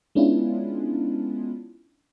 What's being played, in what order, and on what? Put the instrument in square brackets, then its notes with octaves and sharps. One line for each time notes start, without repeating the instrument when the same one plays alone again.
[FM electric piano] G#3 B3 C#4 D4 E4 F4